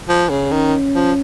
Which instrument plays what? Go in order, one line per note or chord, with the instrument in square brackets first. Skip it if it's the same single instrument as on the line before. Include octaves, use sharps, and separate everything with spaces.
[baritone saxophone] F3
C#3
[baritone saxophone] D#3 [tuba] C#4
[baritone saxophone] F3